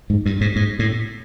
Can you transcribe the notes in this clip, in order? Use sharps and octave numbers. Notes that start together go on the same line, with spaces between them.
G#2
G2
G#2
G#2
A2